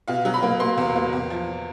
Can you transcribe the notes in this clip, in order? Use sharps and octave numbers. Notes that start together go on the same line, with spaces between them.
B2 F5
F#3
B5
A#3
A#3 C6
E2
A#3
E2
F3